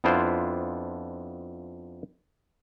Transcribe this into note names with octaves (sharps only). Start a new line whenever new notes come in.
F2 B3 D4 E4 F4 C5